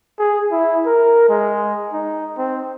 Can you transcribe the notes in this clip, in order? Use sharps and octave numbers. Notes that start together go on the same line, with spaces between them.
G#4
E4
A#4
G#3
D#4
C4